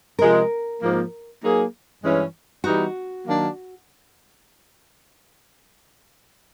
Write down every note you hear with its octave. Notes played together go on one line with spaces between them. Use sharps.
C3 F3 G#3 A#4
G#2 F3 A#3
F#3 A#3 D#4 G#4
G2 E3 G#3 C#4
E3 G3 B3 D#4 F#4
D#3 F#3 A#3 D4